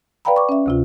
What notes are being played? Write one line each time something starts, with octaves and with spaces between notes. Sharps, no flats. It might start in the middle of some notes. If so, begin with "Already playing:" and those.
B4 D5 F5 G5 A#5 B5
C#6 D6
C#4 E5
D2 C3 F4